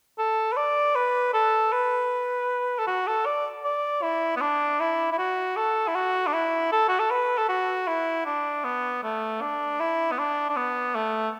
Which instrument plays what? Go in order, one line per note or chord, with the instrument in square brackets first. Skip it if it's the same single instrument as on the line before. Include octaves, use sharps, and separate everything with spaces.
[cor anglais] A4
B4
D5
B4
A4
B4
A4
F#4
A4
D5
D5
E4
B3
D4
E4
E4
F#4
A4
E4
F#4
D4
E4
A4
F#4
A4
B4
A4
F#4
E4
D4
B3
A3
D4
E4
B3
D4
D4
B3
A3